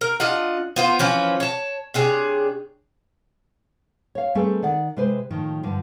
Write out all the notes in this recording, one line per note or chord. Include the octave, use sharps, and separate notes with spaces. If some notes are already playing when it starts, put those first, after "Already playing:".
A#4
D4 F4 D#5 F#5
B3 F4 C5
E3 F3 C#4 B4
C#5 A5
C3 D4 G#4 C#5
C#5 F5
G3 A3 C4 G#4 A4 B4
D#3 D5 F#5
C3 G#3 B4 C5
A2 D#3 F3
G2 D3 F3